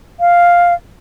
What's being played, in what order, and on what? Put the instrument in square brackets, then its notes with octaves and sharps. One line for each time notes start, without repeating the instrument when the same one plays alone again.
[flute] F5